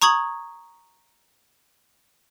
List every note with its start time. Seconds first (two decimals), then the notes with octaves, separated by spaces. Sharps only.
0.02 A#5 C#6 D#6 G#6 F#7